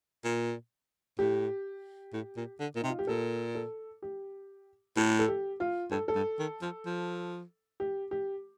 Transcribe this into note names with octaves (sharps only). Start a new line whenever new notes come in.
A#2
A2 G4
A2
A#2
D3
A#2
C3 D#4
F4
G4
A#2 A4
A4
G4
A2 A4
A4
G4
F4
G2 A4
A4
G2
D#3
F3
F3
G4
G4